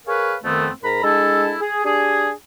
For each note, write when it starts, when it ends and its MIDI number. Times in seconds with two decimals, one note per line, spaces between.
0.07 0.34 68
0.07 0.34 70
0.07 0.34 71
0.07 0.34 73
0.07 0.34 77
0.44 0.69 41
0.44 0.69 51
0.44 0.69 57
0.44 0.69 59
0.44 0.69 60
0.83 1.01 44
0.83 1.01 70
0.83 1.01 82
0.83 1.01 83
1.04 1.54 56
1.04 1.54 62
1.04 1.54 64
1.04 1.54 69
1.61 1.83 68
1.84 2.30 62
1.84 2.30 67
1.84 2.30 68